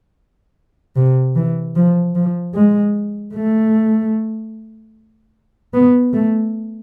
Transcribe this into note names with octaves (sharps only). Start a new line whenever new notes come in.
C3
E3
F3
F3
G#3
A3
B3
A3